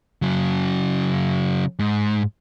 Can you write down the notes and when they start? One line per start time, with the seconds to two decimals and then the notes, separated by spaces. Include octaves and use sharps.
0.22 C#3 F#3
1.79 G#2